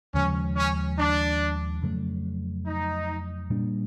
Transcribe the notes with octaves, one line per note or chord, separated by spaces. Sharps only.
D#2 C#3 F3 G#3 C#4
C#4
D4
F2 C#3 F#3 A3
D#4
A#2 G3 A#3 D4